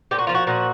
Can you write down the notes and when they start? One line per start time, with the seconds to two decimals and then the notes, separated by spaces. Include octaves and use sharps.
0.11 A#2 G4
0.19 F#4
0.27 F3 F4
0.34 F#4
0.47 A#2 F#4